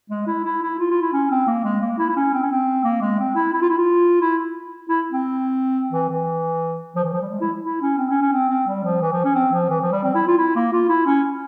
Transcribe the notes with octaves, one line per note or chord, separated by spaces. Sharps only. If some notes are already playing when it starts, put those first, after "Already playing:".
G#3
E4
E4
E4
F4
F4
E4
C#4
C4
A#3
G#3
A#3
E4
E4
C#4
C4
C#4
C4
A#3
G#3
C4
E4
E4
F4
E4
F4
E4
E4
C4
E3
E3
F3
E3
F3
G3
G#3
E4
E4
C#4
C4
C#4
C#4
C4
C4
G3
F3
E3
F3
C#4
C4
F3
E3
F3
G3
C4
E4
F4
E4
A#3
F4
E4
C#4